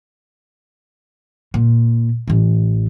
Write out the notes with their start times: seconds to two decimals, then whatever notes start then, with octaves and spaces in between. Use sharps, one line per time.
1.54 A#2
2.28 A1 E3